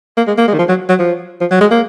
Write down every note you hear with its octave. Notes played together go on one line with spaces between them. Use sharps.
A#3
G#3
A#3
G#3
D#3
F3
F#3
F#3
F3
F3
F#3
G#3
A#3